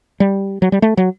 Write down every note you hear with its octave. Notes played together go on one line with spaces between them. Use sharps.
G3
F#3
G3
A3
F#3